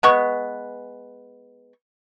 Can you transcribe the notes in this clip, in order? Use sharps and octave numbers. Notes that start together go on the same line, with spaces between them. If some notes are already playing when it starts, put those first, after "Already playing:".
G#3 B3 C#6